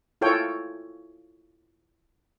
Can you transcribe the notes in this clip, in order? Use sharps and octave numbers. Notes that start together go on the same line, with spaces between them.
E4 F4 A4 C#5 G5